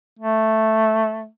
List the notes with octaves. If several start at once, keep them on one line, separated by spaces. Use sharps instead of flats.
A3